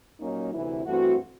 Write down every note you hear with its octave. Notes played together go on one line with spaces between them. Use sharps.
A#2 F#3 A#3 C#4 D#4
D2 C3 E3 E4
G2 E3 A3 C4 F#4